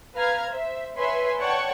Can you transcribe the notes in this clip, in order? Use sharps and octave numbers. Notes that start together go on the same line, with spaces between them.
B4 F5 A#5 F6 G#6
C5 E5
B4 C#5 E5 G#5 B5 C6
C#5 D5 F#5 G5 A5 C#6